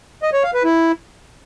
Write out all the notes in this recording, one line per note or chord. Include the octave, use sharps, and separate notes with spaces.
D#5
C#5
F5
B4
E4